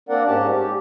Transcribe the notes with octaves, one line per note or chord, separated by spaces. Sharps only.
A#3 C4 D4 A#4 D5 F#5
G#2 C#4 G4 A5
G4